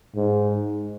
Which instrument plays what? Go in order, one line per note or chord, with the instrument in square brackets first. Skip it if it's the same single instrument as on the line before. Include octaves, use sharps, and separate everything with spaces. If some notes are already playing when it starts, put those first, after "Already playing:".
[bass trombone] G#2